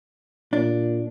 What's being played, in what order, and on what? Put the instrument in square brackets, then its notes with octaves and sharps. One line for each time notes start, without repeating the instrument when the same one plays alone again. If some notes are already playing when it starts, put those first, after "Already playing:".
[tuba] A#2 [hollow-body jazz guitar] D4